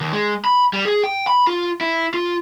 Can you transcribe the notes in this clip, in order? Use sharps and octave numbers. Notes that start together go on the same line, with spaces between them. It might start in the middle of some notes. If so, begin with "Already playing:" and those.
D#2
G#3
B5
G3
G#4
G5
B5
F4
E4
F4